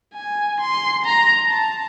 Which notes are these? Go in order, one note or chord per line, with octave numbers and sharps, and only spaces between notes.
G#5
C6
A#5
A5